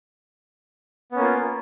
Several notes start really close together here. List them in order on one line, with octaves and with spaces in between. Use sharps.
B3 C#4 A#3 F4